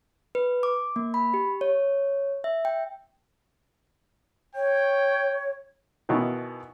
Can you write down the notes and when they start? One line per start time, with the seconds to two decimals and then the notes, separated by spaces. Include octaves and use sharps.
0.35 B4
0.63 D6
0.96 A#3
1.14 B5
1.34 G4
1.61 C#5
2.44 E5
2.65 G5
4.55 C#5 G5
6.09 B2 D#3 E3